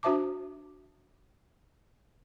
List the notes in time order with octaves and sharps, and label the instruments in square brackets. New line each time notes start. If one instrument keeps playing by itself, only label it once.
[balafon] D4 F#4 C5 E5 A5 D6